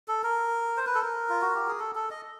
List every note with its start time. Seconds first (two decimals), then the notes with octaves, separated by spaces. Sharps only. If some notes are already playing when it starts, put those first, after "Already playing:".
0.08 A4
0.23 A#4
0.77 C5
0.87 B4
0.95 A4
1.01 A#4
1.29 F4
1.41 F#4
1.55 G4
1.67 G#4
1.80 A4
1.95 A4
2.11 D#5